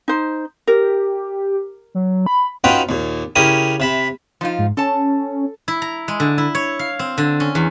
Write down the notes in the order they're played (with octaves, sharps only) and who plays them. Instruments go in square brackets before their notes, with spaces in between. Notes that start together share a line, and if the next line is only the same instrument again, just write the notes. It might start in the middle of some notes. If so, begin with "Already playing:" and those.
[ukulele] D#4 C5
[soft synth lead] G4 [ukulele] A#4
[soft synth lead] F#3
B5
[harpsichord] C#4 D#4 F4 F#4 B4 G5
D#2 A#2
C#3 C#4 E4 G4 A#4 D#6
C3 E5 B5
[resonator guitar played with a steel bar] F3 D#4 F4
[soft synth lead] G#2
[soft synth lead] C#4 [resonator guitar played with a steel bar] A4 A5
[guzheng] E4
A#5
G#3
D3
E4
C#5
F5
C4
D3
C#4
E2